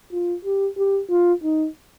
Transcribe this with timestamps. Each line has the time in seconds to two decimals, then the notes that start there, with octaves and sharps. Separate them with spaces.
0.12 F4
0.45 G4
0.77 G4
1.10 F4
1.43 D#4